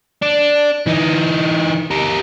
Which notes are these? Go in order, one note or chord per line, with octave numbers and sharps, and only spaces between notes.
D4
E3 D#4
G4 A#4